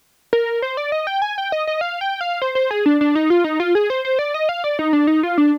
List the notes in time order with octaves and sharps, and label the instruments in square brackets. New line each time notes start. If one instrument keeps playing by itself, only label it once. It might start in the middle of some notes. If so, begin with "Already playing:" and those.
[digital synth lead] A#4
C5
D5
D#5
G5
G#5
G5
D#5
D#5
F5
G5
F5
C5
C5
G#4
D4
D4
D#4
F4
D#4
F4
G#4
C5
C5
D5
D#5
F5
D5
D#4
D4
D#4
F4
D4